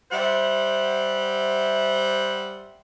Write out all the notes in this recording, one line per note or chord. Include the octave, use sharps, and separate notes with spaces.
G3 C5 E5 F#5